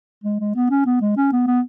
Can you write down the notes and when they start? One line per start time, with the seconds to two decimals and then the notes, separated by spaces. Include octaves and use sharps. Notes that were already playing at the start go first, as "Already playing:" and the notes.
0.24 G#3
0.40 G#3
0.55 B3
0.70 C#4
0.86 B3
1.01 G#3
1.17 C#4
1.32 B3
1.47 B3